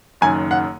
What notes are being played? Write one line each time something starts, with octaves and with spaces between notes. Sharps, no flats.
F#1 F#2 D#3 G#5
F#5